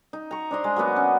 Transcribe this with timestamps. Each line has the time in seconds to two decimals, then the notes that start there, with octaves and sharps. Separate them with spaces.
0.13 D#4
0.31 A#5 C#6
0.51 D4 C5 D#5
0.64 G#3
0.76 F#3 A#3 B3 F#4
0.96 C#4